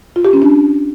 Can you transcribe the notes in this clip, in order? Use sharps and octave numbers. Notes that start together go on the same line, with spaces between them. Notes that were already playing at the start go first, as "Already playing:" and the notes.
F4
G4
C#4
D4